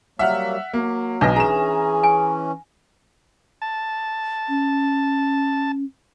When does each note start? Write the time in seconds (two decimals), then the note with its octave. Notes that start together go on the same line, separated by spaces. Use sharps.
0.19 F#3 G3 A#3 E5 F#5 F6
0.73 F#3 A#3
1.21 B1 D4 D#4 B4 D#5 A#6
1.36 E3 C#4 G#4 A#5 E7
2.03 G#5
3.62 A5
4.49 C#4